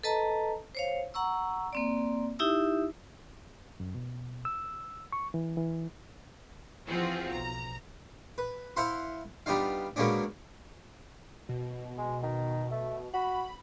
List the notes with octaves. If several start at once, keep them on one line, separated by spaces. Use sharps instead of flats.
A4 B4 D#5 A5 A#5
C5 C#5 F5
F#5 A#5 C#6 E6
A#3 C4 D5
D#4 E4 G4 E5 D#6 E6
F#2
B2
E6
C#6
E3
E3
E3 F3 C4 F4 F#4 G#4
B1 A#5
B4
E4 C5 F5 F#5 B5 C6
G3 B3 D4 D#4 F4 F5
B2 G#3 A#3 B3 C#4 D4
B2
G#3
D#3
A3
F#4 B5